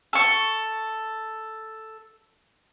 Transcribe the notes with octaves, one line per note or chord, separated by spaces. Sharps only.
A4 C#6